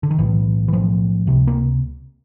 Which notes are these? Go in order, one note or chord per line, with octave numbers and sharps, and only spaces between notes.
D3
D#3
B1 A2 E3
E3
B1 A2 F3
C#2 C3
A#3